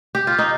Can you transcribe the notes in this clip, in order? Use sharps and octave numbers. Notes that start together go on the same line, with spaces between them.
G4
F4
D#4